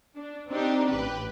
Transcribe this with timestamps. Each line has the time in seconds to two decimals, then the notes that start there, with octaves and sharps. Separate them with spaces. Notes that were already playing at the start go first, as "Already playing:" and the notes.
0.16 D4
0.48 C4 D4 D#4 G4
0.88 A1 G4 B4